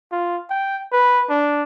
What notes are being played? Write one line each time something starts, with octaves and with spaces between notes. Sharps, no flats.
F4
G5
B4
D4